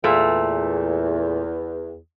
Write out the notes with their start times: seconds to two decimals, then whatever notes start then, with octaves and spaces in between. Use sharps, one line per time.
0.04 E2 A#2 A3